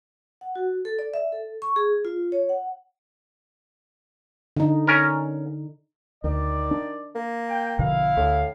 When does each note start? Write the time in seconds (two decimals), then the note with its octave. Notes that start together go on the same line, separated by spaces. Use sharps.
0.41 F#5
0.56 F#4
0.85 A4
0.99 D5
1.14 E5
1.32 A4
1.62 C#6
1.76 G#4
2.05 F4
2.32 C#5
2.49 F#5
4.56 D3 D#4
4.87 C#4 A#4
6.24 D2 D#3 D5
6.71 D4
7.15 A#3
7.48 G5
7.79 A#1 B2 D3 E4 F5
8.17 D2 A2